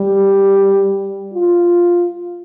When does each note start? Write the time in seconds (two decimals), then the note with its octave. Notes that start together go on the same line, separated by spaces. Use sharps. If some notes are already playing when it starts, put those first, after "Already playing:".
Already playing: G3
1.33 F4